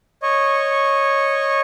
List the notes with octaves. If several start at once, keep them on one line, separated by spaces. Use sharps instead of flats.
C#5 D#5 C#6